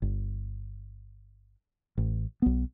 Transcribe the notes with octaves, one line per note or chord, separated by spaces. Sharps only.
G1
A1
B1 B3